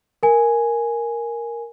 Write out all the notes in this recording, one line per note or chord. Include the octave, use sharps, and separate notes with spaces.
A#4 G#5